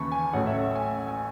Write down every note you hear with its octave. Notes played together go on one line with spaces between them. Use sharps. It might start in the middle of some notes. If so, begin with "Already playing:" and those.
Already playing: D#2 C#3 E3 A5 B5 C#6
G#5
A1 A2 F#3 A3 C#4 F#5
E5
F#5
G#5
G#5